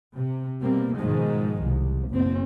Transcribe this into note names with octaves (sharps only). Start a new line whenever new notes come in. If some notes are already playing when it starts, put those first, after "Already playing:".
C3
B2 G3 A#3 C4
G#2 B2 D#3 F3 G#3
C2
F#1 B2 C4